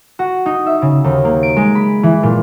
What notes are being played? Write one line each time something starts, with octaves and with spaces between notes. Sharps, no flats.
F#4
D#4
E5
C#3
D#2
A#3
D7
G#3
B5
E3
A#2